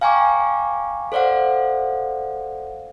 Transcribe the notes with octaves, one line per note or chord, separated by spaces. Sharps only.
F5 G5 G#5 A#5 C#6 D6
A4 C5 D5 F5 F#5